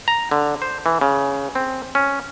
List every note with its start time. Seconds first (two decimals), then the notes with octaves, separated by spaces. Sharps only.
0.08 A#5
0.31 D3
0.62 C5
0.86 E3
1.01 C#3
1.55 C4
1.95 C#4